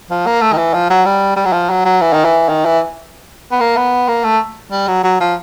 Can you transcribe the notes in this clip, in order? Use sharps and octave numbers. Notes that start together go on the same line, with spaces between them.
F3
A#3
A3
D#3
E3
F3
F#3
G3
G3
F#3
F3
F#3
F#3
E3
D#3
E3
D#3
E3
B3
A#3
B3
A#3
A3
G3
F#3
F#3
F3